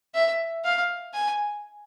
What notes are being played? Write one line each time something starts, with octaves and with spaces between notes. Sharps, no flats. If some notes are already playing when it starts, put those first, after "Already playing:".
E5
F5
G#5